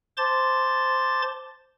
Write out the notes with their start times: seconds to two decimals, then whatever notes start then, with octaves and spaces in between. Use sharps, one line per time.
0.17 C5 A5 C6 D6 A6